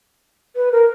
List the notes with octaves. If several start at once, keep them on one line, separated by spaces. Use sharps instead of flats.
B4
A#4